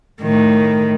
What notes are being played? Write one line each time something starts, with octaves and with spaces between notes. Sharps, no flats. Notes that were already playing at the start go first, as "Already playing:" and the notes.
A2 D#3